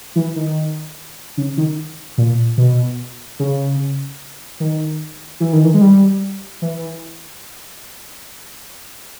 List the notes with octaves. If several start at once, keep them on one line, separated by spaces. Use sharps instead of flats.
E3
D#3
C#3
D#3
A#2
B2
C#3
D#3
E3
D#3
E3
G#3
G3
E3